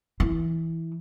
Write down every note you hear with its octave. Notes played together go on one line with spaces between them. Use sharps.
E3